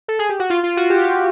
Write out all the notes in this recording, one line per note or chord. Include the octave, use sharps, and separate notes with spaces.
A4
G#4
G4
F#4
F4
F4
F#4
G4
G4